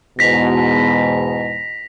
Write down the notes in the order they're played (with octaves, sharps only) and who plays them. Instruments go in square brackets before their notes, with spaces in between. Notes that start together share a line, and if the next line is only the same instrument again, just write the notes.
[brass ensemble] E2 G#2 B2 [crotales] A#6 B6 F7